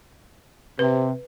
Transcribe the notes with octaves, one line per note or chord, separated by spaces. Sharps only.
C3 B4